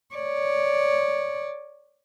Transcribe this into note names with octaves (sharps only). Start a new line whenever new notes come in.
C#5 D5